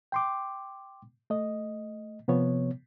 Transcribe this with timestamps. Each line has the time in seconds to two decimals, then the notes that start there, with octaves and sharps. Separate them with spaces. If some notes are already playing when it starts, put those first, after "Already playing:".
0.12 G5 C6 D6
1.30 A3 D#5
2.28 C3 F3 B3 C#5